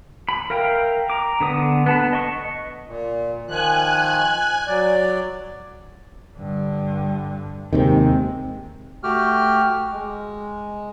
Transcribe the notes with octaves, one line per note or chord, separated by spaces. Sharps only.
B5
A#4 E5 F5 G5
A#5 D6
D3 B3 D#6
B3 A5 B5
D#5 C#6
A#2
D#3 F3 G#5 F#6
F#3 D5
G2 D3
D#2 C3 D#3 G#3 C4
A3 F#4 G4 G5 F6
G#3